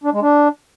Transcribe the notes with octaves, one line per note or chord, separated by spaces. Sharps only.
D4
G#3
D4